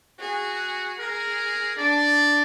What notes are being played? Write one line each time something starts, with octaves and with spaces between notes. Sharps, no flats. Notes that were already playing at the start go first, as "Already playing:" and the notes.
F#4 G#4
G#4 A#4
D4 D5